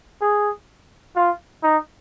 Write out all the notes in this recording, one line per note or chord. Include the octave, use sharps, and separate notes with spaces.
G#4
F4
D#4